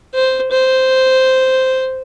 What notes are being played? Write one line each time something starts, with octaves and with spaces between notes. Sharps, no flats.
C5
C5